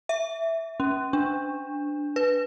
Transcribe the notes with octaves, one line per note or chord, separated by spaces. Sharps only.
E5
C#4
D4
B4